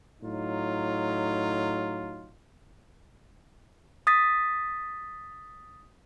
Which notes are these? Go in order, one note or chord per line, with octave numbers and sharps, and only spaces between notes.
A2 F#3 D#4 F4
D#6 A6 B6